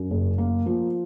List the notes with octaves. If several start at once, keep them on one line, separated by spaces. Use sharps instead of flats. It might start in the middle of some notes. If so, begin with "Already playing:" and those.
Already playing: F#2
F#1
A#3
F3